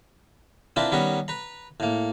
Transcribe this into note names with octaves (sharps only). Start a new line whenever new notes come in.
C4 D4 E4 F4 A#4 B4
D#3 G3 B3 C#4 A#4 B4
B4 A#5
A2 A#3